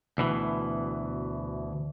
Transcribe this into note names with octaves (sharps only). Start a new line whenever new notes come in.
D2 B2 E3